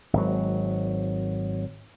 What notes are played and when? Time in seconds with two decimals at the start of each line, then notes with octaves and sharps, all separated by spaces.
0.13 G#1 F#3